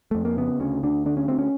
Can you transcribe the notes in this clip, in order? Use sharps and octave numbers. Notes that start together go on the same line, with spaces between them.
F2 A3
A#3
C#3 B3
D2 C#4
D2 D4
D3 D4
C#4
D2 C4
C#4